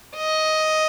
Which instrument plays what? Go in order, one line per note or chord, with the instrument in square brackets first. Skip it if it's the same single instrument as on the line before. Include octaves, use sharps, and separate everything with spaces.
[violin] D#5